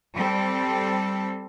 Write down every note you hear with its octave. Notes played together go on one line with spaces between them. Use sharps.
G3 C4 A4